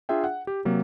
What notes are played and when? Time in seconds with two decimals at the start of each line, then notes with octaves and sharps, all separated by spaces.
0.09 D4 F4 G#4 E5 G5
0.24 F#5
0.47 G4
0.65 C3 F#3 A#3